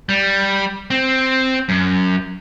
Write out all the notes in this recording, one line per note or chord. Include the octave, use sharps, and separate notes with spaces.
G3
C4
F#2